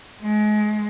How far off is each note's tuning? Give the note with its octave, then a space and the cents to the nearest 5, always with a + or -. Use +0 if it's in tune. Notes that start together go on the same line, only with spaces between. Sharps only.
G#3 +30